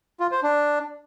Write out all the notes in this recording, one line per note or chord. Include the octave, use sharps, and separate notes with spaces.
F4
C5
D4